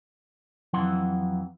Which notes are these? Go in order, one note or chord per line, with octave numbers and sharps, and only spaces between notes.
F2 E3 F#3 E4 F#5 C6